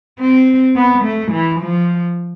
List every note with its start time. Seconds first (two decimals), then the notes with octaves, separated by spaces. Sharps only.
0.20 C4
0.76 B3
1.04 A3
1.32 E3
1.60 F3